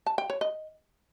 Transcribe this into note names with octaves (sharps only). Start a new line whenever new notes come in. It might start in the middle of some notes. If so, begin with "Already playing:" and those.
A5
G5
C#5
D#5